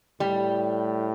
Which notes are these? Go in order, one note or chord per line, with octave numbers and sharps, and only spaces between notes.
A2 G3